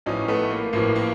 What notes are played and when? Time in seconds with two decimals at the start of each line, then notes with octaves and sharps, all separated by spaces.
0.06 A1 A2 F3 C#4 D#4
0.28 A3 B3
0.51 A#3
0.73 A1 A2 F3 A#3
0.96 A#3